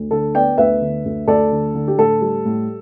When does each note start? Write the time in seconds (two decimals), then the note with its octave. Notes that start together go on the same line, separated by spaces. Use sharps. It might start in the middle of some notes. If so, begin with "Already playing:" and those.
Already playing: D2
0.11 D3 A4
0.35 B3 D5 G5
0.58 D2 B4 E5
0.81 D3
1.05 D2
1.28 D2 A4 D5
1.52 D3
1.75 D3
1.88 G4
1.98 A2 A4
2.21 G3
2.45 A2